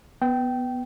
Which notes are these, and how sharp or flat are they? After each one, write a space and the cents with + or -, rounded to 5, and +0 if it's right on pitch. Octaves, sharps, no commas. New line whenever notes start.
B3 +0 G5 -20